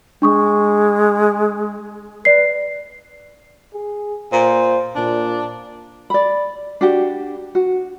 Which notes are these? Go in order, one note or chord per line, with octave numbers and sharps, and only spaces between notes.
G#3 D4 C#6 D#6
B4 D5 C7
G#4
A#2 C5
A#2 D4
D5 B5
D4 F#4 G4
F#4